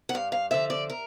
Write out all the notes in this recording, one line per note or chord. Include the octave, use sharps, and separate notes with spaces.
F#5
G2 F5
F5
D3 F3 E5
D5
A#4